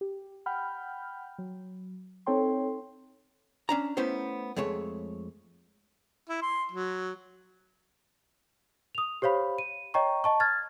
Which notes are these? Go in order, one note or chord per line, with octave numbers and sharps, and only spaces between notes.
G4
F#5 G5 B5 F6 G6
F#3
C4 D#4 A4 C#5 G5 C6
C#4 D4 A#5
A3 B3 C#4 E4 C5
F2 G#3 A3 C#5
E4
C6
F#3
D#6 F7
G4 C5 C#5 F5 B5
D#7
C#5 D#5 G5 A#5 C#6
D#5 A5 C#6
F6 G#6 A6